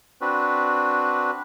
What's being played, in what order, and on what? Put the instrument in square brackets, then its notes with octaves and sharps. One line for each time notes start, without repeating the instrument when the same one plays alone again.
[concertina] C4 D4 F#4 B4